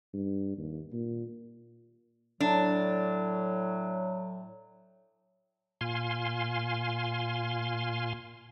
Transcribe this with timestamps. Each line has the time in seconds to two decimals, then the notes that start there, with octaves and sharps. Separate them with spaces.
0.14 G2
0.57 D#2
0.92 A#2
2.40 A2 F#3 D4
5.81 A#2 F5 G#5 C6